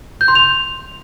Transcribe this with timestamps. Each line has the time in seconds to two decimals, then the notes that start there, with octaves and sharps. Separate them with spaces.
0.21 G6
0.28 C6
0.35 F7